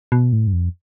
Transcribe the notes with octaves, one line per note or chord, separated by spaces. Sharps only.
B2
A2
G2
F2